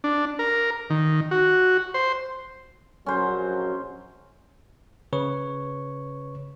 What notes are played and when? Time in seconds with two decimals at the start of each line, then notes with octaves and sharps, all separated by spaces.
0.04 D4
0.39 A#4
0.90 D#3
1.31 F#4
1.94 C5
3.06 A#1 F#3 C#4 C5
5.13 C#3 B4 C#5 C#6